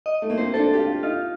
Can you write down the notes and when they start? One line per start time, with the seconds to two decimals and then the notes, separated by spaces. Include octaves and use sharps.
0.06 D#5
0.22 A3
0.30 A#3
0.38 C4 C5
0.54 D4 A4
0.73 G4
0.78 F4
1.03 D#4 F4